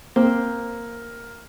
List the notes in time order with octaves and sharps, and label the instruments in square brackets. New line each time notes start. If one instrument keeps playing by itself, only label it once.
[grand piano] A#3 [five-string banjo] C4